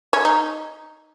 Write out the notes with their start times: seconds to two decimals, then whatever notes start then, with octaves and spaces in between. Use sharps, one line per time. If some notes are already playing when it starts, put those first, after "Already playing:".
0.13 C#4
0.25 D#4